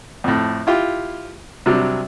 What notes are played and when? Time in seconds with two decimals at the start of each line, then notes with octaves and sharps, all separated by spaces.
0.24 F2 A2
0.67 E4 F4 G4
1.66 C3 F#3 G3 D4